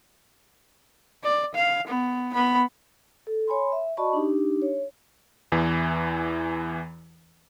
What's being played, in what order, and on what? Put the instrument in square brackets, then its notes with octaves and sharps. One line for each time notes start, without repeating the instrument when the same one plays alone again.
[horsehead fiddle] D5
F5
B3
B3 B5
[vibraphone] A4
C#5 G#5 B5 C6
E5
F#4 D5 D#5 A5 B5 C#6
D4 D#4 G4
C#5
[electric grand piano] E2 E3